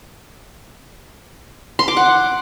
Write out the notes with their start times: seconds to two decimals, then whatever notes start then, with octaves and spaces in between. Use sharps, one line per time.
1.79 C6
1.88 D6
1.97 F#5